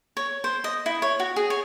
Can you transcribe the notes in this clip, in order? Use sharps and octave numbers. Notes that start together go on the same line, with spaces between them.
C#5
C5
D#5
E4
C#5
F#4
G#4
C#5